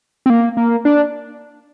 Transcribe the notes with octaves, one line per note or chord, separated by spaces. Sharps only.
C4
A#3
A#3
D4